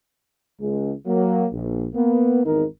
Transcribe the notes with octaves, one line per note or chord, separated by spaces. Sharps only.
C#2 G#3
F#3 A#3
A#1
A#3 B3
G#1 E2 D#3 D#4 A#4